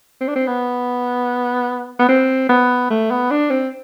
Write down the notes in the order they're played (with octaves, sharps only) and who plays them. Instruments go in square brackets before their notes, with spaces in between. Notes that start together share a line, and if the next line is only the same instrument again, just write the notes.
[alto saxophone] C4
D4
C4
B3
B3
C4
B3
A3
B3
D4
C4